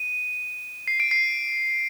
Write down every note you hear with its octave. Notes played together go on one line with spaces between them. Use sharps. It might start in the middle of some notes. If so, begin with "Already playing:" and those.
Already playing: D#7
C7
D7
C7